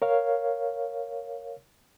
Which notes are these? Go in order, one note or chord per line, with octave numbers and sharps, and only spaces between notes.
A#4 C#5 F5